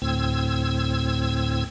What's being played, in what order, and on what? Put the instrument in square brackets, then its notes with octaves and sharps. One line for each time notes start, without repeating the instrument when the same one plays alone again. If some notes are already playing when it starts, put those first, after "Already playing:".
[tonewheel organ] D2 A2 C4 E6 G#6